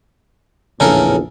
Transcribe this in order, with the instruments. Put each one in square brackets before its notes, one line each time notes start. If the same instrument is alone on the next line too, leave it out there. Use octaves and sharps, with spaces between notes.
[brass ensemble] A#1 E2 A2 [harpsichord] C#3 A4 A#4